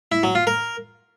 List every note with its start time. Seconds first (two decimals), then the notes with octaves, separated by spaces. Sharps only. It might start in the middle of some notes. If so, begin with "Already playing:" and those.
0.12 E4
0.23 F#3
0.35 F4
0.47 A#4